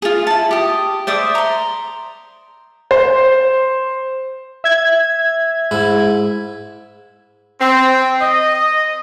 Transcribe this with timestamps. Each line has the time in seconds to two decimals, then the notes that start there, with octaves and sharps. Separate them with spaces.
0.02 F4 G#4
0.27 E4 A5
0.51 G4 D#6
1.07 C5 D5 E5 D#6
1.35 A#5 C6
2.91 C5
4.64 E5 G#6
5.71 G#2 E4
7.61 C4
8.21 D#5